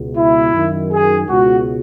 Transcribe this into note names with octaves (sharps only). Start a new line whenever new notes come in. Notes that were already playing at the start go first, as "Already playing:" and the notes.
Already playing: C#2 B2
E4
F#2 D#3
G#4
C#2 B2 F#4